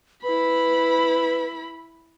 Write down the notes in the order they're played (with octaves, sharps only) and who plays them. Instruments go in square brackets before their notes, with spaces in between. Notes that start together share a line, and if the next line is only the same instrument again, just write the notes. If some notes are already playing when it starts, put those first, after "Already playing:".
[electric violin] E4 B5 [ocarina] B4